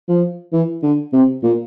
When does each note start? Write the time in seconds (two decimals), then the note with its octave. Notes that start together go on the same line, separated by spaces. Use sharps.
0.08 F3
0.53 E3
0.83 D3
1.13 C3
1.43 A#2